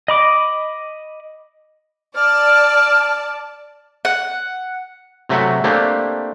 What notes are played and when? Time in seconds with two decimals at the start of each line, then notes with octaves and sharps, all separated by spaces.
0.08 D#5 B5 D6
2.16 D5 A5 F6
4.05 F#5
5.29 C3 F#3 A3 E5 F#5
5.64 A3 A#3 C4 D4 G4